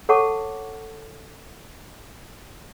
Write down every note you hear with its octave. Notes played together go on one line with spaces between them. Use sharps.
A4 C#5 F#5 A5 C#6 D6